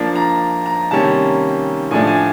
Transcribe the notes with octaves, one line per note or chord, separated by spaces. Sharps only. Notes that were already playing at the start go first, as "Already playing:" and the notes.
Already playing: F3 A#3 D4
A#5
A#5
C3 D#3 G3 A#3 C#4 A5
A2 F3 A3 D4 G#5
G#5